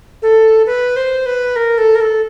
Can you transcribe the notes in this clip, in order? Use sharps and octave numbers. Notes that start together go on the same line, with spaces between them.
A4
B4
C5
B4
A#4
A4
A#4
A4